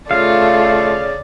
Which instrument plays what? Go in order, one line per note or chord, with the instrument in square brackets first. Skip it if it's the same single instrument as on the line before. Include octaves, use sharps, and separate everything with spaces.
[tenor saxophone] C#3 [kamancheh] A3 F4 [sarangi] D5 [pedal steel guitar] F5